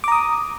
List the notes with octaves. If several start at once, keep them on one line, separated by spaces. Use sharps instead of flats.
A#5 D6 D#6